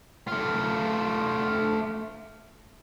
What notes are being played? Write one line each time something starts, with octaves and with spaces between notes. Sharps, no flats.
A3 F4